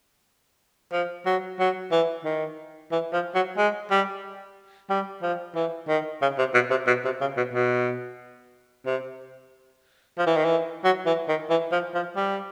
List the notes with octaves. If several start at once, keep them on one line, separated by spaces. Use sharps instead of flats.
F3
F#3
F#3
E3
D#3
E3
F3
F#3
G#3
G3
G3
F3
E3
D#3
C#3
C3
B2
C3
B2
C3
C#3
B2
B2
C3
F3
E3
D#3
E3
F#3
E3
D#3
E3
F3
F3
G3